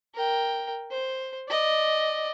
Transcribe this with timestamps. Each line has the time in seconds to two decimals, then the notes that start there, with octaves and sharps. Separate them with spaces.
0.15 A#4 G5
0.91 C5
1.49 D5 D#5